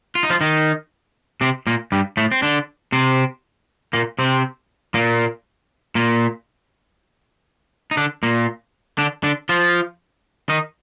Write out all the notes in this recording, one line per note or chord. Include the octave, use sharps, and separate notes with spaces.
F4
D#4
F3 F4
D#3 D#4
C3 C4
A#2 A#3
G2 G3
A2 A3
C4
D3 D4
C3 C4
A#2 A#3
C3 C4
A#2 A#3
A#2 A#3
D#4
D3 D4
A#2 A#3
D3 D4
D3 D4
F3 F4
D#3 D#4